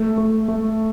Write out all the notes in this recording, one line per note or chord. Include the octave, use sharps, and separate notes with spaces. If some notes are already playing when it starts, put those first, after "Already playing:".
Already playing: A3
A3
A3